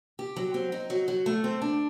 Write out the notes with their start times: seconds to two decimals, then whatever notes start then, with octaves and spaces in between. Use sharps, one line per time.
0.19 G4
0.36 F#3
0.54 C4
0.72 D#4
0.90 F#3
1.08 F#3
1.26 A3
1.44 C4
1.62 D4